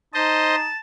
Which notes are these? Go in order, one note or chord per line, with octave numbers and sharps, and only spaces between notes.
D#4 C5 D#5 A5